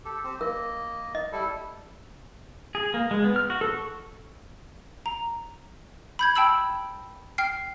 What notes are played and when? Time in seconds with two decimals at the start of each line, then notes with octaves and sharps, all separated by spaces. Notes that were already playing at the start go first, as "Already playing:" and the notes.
0.05 G4 A4
0.24 C4 G4
0.41 A#3 A#4 D#5
1.15 D#5
1.32 G3 E4 A4
2.75 G#4
2.94 A#3
3.11 G#3
3.24 B3
3.36 F6
3.50 F#4
3.61 A4
3.75 C#6
5.06 A#5
6.19 B5 G6 G#6
6.36 G5 A5 B5 E6 F#7
7.38 G5 F6 C7